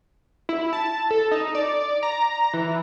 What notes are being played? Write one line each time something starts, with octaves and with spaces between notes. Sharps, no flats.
E4
A5
A4
D#4
D5
A#5
E3